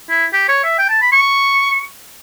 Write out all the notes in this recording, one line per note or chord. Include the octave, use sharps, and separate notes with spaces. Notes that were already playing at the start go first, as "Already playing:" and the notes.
E4
G4
C#5
E5
G5
A5
B5
C#6